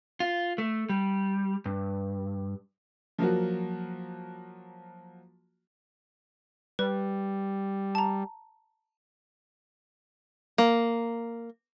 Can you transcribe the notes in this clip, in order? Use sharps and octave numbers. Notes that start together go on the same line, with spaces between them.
F4
A3
G3
G2
F3 F#3 A#3 F#4
G3 B4
A5 A#5
A#3